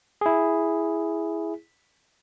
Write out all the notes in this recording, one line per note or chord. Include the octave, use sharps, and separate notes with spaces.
E4 G#4